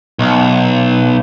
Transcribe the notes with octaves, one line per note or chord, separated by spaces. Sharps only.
B1